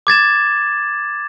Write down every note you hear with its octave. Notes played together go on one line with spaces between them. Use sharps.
D6 G#6 A6 E7